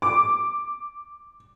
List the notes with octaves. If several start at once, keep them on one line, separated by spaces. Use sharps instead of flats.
D6